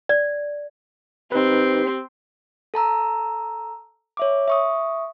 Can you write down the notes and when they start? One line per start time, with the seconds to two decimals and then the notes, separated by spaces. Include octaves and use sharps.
0.09 D5
1.32 C4 D#4 G4 B4
2.74 A4 A5 A#5 E6
4.17 C#5 E5 D6
4.48 E5 C#6 D#6